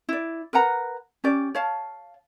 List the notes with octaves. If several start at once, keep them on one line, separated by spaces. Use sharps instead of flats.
E4 D5
A#4 B4 F#5 A#5
C#4 G4 D5
C#5 F5 A5